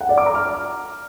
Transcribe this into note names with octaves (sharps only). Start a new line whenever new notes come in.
F#5
D5
D6
A#5
F6